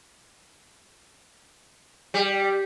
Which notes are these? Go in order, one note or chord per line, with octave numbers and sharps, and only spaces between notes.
G3